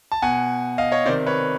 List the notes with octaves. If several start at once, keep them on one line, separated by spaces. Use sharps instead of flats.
A5
B2 F#5 G#5
D#5 F5
C#5 D#5
C3 D#3 C5 D5
B4 C#5